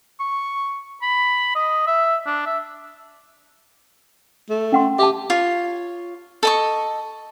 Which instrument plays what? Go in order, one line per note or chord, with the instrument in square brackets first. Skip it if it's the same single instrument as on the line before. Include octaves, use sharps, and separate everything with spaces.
[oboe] C#6
B5
D#5
E5
D4
E5
[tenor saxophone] A3
[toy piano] C#4 F#5 C6
[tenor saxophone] G4 [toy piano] E5 A5
[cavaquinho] F4 C#5
A4 D#5 C#6